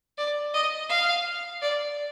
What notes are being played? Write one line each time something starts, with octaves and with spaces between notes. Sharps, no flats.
D5
D#5
F5
D5